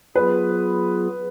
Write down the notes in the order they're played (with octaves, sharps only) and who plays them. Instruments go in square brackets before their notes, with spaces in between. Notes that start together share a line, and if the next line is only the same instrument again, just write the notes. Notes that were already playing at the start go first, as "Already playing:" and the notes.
[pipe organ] F#3 B3 F4 G#4 [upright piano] B4